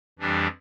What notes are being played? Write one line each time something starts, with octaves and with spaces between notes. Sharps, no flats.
F2 E3 G3 D4 G4